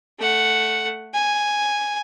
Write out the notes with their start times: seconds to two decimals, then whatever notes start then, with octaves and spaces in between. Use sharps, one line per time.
0.19 A3 F#5
1.14 G#5